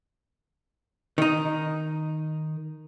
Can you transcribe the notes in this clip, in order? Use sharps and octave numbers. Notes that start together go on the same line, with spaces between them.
D#3 D#4